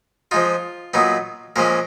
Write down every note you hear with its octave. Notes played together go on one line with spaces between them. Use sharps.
F3 G#3 D#4 F4
A#2 F#3 B3 D#4
A#2 F3 G#3 C#4 A#4